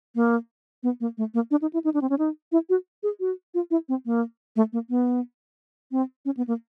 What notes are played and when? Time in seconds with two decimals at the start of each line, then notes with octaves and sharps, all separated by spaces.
0.15 A#3
0.83 B3
1.00 A#3
1.18 A3
1.34 A#3
1.51 D4
1.62 D#4
1.73 E4
1.84 D#4
1.94 D4
2.02 C4
2.10 C#4
2.19 D#4
2.52 E4
2.69 F#4
3.03 G#4
3.20 F#4
3.54 F4
3.71 E4
3.89 C4
4.06 A#3
4.56 A3
4.73 A#3
4.90 B3
5.92 C4
6.25 C#4
6.37 B3
6.47 A#3